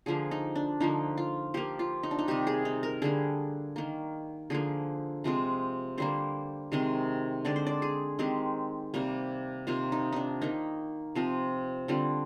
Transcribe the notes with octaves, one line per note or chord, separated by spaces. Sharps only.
D3 F3 A#3 G#4
D#4
D4
D3 F3 A#3 D#4
F4
F3 A#3 G4
F4
D#4
D4
D#4
C3 D#3 G3 G4
G#4
D#4
A#4
D3 G3 A#3 G#4
D#3 A#3
D3 F3 A#3 G#4
C3 F3 G#3 C4
D3 G3 A#3 C5
C3 D#3 G#3 C4
D3 G#3 C4 D5
C5
D5
G#4
D#3 G#3 C4 G4
C3 G3 A#3
C3 D#3 A#3 F4
D#4
D4 D#4
D#3 A#3 D#4
C3 F3 C4
D3 G3 C4 F4